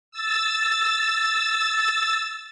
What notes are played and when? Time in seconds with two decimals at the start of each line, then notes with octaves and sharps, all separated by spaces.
0.12 E6 A6